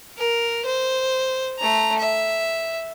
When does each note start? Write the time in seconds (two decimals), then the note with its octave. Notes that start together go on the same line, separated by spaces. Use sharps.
0.18 A#4
0.65 C5
1.59 A3 A#5
1.98 E5